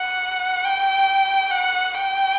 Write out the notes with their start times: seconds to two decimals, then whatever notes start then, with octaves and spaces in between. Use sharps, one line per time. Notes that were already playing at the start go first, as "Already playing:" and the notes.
Already playing: F#5
0.65 G5
1.51 F#5
1.94 G5